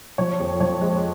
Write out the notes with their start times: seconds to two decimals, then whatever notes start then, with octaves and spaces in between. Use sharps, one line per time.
0.18 F3 C#5
0.40 F2
0.60 F3 C#5
0.81 G#3